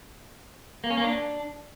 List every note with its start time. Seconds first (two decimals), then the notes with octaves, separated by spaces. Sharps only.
0.84 A#3
0.90 C#4
0.97 A#3
1.04 D4